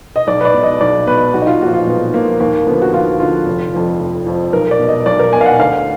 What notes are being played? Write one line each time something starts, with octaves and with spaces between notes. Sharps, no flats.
D#5
B1 D5
B4
D5
B2
D#5
B1 D5
B2 B4
B1 F#4
D#4
F4
A#2 F3 F#4
F4
B1 B3
A#2 F3 A#3
D#2 A#3
D3 F3 B3
F#4
D#2 F4
D3 F3 F4
F1
F2 F3
F1
F2 F3
B1 A#4
D5
B2
D#5
B1 D5
A#4
B2 G#5
F5
F#5
D2 F5